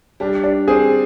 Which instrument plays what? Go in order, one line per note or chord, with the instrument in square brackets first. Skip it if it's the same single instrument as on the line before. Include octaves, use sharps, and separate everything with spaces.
[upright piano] G3 [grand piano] D4
[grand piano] D4
[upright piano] C4 [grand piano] G#4